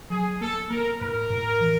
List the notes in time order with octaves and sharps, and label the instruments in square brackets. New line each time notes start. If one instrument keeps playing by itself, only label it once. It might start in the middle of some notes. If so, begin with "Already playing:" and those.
[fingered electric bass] F#3 [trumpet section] G#4
[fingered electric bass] A#3 [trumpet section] A4
[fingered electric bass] A#3 [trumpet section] A#4
[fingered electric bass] A2 [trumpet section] A#4
[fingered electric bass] A2
E3